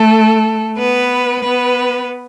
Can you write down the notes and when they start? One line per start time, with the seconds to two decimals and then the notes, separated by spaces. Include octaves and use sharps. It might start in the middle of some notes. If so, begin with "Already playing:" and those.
Already playing: A3 A4
0.77 B3 B4
1.42 B3 B4